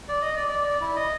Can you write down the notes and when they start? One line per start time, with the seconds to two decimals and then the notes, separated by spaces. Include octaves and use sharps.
0.09 D5
0.22 D#5
0.36 D5
0.49 D5
0.64 D5
0.81 E4
0.96 D#5